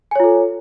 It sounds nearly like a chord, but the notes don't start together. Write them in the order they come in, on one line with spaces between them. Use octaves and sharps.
G#5 C#5 F4 A4